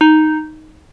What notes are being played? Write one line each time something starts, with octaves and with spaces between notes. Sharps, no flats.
D#4